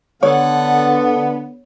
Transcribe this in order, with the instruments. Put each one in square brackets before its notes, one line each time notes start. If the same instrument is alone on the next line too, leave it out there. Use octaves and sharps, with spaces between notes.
[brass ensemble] D3 [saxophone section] B3 [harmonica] A4 F#5 [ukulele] C#5